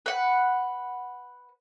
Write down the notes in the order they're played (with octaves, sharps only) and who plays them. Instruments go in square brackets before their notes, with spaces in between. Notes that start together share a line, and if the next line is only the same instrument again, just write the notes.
[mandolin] B4 F#5